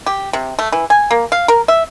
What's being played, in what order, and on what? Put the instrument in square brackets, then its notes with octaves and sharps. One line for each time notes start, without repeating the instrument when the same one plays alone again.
[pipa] G4
C3
A3
E3
G#5
A#3
F5
A#4
E5